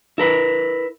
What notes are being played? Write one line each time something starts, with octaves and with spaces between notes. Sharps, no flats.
E4 A#4 B4